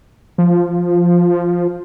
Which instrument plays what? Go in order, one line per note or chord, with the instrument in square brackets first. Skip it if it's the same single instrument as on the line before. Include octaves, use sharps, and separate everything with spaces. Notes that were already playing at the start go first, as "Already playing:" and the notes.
[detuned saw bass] F3